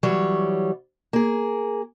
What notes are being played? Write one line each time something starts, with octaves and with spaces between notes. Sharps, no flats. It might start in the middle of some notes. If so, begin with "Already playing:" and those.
E3 F#3 G3 C#5
A#3 G#4